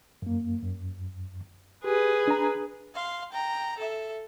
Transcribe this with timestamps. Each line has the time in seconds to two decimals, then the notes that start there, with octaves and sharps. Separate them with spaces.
0.22 F#2 A#3
0.62 F#2
1.84 G4 G#4 B4
2.28 D4 A#5
2.95 F5 C6
3.32 G5 A#5
3.78 A4 E5